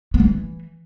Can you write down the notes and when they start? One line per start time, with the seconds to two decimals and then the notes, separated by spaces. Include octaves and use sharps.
0.14 B3
0.20 G3
0.25 E3